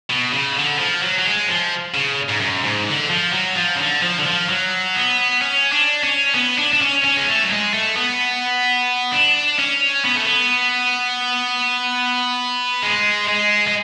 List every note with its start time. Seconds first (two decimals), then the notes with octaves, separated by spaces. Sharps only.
0.10 B2
0.33 C#3
0.56 D3
0.79 F3
1.02 F#3
1.19 F#3
1.26 G#3
1.48 F3
1.94 C#3
2.29 G#2
2.41 F#2
2.65 G#2
2.88 D3
3.10 F3
3.33 F#3
3.57 F3
3.76 C#3
3.80 D3
4.03 F3
4.19 D3
4.26 F3
4.49 F#3
4.96 B3
5.42 C#4
5.72 D4
6.03 C#4
6.35 B3
6.58 D4
6.72 D4
6.81 C#4
7.04 C#4
7.17 G#3
7.28 A3
7.44 F#3
7.50 G#3
7.74 A3
7.96 B3
9.11 D4
9.59 C#4
10.04 B3
10.16 A3
10.25 B3
12.83 G#3
13.28 G#3
13.68 G#3